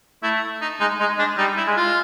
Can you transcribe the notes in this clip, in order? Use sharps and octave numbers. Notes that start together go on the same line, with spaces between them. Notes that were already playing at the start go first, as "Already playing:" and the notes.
A3 E4
D#4
G#3 D#4
G#3 D#4
G#3 D4
G3 D#4
E4
G#3
F4